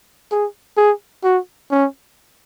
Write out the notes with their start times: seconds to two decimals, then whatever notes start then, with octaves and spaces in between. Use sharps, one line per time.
0.31 G#4
0.77 G#4
1.24 F#4
1.71 C#4